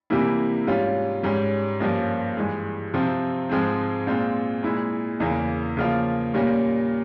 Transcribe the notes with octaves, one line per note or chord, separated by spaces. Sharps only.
C3 E3 G3 A#3 E4
G#2 G3 C#4 F4
G#2 G3 C#4
G2 F3 A#3 C#4
G2 E3 G#3
C3 F3 C4
G#2 F3 G#3 C4
A#2 G#3 C4 F4
A#2 G#3 E4
E2 C#3 E3 A#3
C#3 F3 A#3 F4
A#2 G3 A#3 C#4